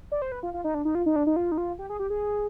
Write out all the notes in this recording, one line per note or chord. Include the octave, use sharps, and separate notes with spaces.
D5
C5
B4
F4
F4
D#4
D4
D#4
F4
D#4
D4
D#4
F4
D#4
F4
G4
G#4
G4
G#4